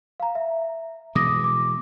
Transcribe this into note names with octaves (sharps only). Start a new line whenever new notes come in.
F5 A#5
E5
B2 E3 G#3 D6 D#6 A#6
D6